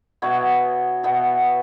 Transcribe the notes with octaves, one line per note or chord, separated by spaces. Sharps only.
B2 B3 E4 C#5
B2 B3 E4